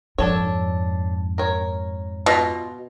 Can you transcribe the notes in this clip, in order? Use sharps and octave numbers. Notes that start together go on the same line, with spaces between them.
F2 G#2 D4 A4 C#5
A#4 C#5
B2 F4 D#5